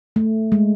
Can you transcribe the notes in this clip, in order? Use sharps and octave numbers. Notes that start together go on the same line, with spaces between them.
A3
G#3